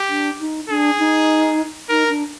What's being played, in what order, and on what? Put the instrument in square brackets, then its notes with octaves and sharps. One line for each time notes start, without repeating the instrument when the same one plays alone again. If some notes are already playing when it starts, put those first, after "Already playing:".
Already playing: [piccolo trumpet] G4
[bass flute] D4
D#4
[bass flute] D4 [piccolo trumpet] G#4
[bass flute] D#4
[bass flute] D#4 [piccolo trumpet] A#4
[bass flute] D4